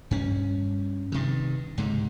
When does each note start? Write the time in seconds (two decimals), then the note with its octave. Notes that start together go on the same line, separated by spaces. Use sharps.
0.11 G2 C#4
1.12 G2 C3 D#3
1.78 C#2 G#2 C3